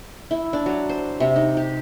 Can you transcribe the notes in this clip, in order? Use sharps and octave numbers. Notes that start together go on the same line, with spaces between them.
E4
D4
F#3
C5
C3
D#4
G4